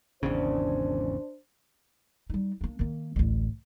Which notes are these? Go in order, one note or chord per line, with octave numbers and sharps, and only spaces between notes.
G#1 E2 C#3 D4 C5
G3 D#4
A#3 D4
D#3 A#3
A1 D2